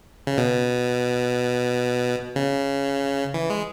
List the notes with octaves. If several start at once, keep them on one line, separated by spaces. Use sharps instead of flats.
C#3
B2
C#3
E3
G#3